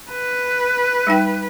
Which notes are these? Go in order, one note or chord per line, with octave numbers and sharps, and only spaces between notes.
B4
G3 D#4 G5